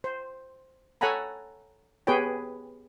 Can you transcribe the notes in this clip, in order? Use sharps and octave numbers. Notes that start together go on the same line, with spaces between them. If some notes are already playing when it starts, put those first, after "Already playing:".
C5
A4 C#5 F#5 G#5 A#5 B5
B3 G4 G#4 B4 C#5 G5